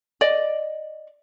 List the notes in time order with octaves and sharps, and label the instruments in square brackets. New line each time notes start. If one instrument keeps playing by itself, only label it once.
[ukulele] D5 D#5